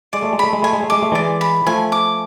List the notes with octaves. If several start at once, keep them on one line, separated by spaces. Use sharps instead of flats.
G#3 D5
A3
G#3
A3 B5
G#3
A3 G#5
G#3
A3
G#3 D6
A3
E3 G#3 D5
B5
F3 A3 G#5
D6